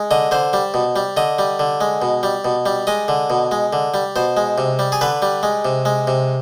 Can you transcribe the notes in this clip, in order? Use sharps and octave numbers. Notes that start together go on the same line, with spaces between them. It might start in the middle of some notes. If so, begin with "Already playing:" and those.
Already playing: G#3
D3 D#5
D3 C5
G3
B2
G3
D3 D#5
G3
D3
G#3
B2
G3
B2
G3
G#3 D#5
D3
B2
G#3
D3
G3
B2 C5
G#3
C3
G3
G#4
D3 B4
G3
G#3
C3
G#3
C3